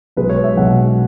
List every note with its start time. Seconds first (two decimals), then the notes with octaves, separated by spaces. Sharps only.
0.17 B1 B2 G#3 B4
0.30 C#5
0.44 E5
0.56 B1 B2 G#3 F#5